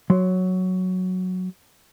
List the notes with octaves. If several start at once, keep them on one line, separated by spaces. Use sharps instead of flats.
F#3 C6